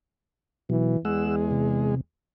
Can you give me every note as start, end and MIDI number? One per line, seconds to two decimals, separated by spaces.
0.70 0.97 47
0.70 0.98 52
0.70 0.97 54
1.05 1.93 40
1.05 1.95 56
1.05 1.36 78
1.05 1.36 88
1.51 2.01 48